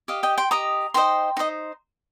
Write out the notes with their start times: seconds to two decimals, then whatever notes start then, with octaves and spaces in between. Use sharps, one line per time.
0.08 G4 D#5 F5
0.23 D#5 G5
0.38 G5 C6
0.51 G4 D#5 A#5 D#6
0.94 D#4 C5 D#5 G5 C6
1.37 D#4 C5 D#5